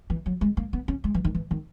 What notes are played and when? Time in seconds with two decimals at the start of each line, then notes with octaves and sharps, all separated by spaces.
0.10 E3
0.26 F#3
0.41 G#3
0.57 A#3
0.73 B3
0.88 C#4
1.04 G#3
1.14 E3
1.25 D#3
1.35 E3
1.51 D#3